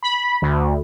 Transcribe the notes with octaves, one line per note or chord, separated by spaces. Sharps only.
B5
D2